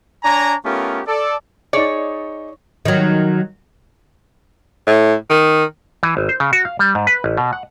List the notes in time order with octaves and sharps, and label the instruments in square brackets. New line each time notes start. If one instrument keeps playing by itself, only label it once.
[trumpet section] D4 C#5 G#5 A#5
A3 B3 C#4 F4 G4 A#4
A4 D5
[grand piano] D#4 G#4 [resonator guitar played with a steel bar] C#5 [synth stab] D5
[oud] D#3 F#3
[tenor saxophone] A2
D#3
[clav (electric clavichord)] E3
G#1
C5
C#3
F#4
F5
G3
G#2
B4
A1
B2
F#5